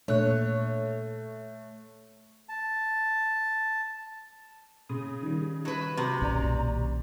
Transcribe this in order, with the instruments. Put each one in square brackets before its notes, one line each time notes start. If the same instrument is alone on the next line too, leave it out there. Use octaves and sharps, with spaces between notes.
[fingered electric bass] A#2 D4 [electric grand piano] A3 F#6 [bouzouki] C#5
[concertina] A5
[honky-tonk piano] C#3 [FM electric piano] D#6
[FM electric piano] D#3 G3
[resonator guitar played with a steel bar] F#3 B4
[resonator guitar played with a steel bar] C3 [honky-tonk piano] F#3
[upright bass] B1 A#2 [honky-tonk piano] C#4 D5 A#5